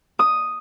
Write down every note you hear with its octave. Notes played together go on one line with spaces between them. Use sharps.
D#6